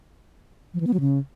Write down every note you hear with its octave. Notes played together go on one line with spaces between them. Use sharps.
F3
E3
B3
F#3
C#3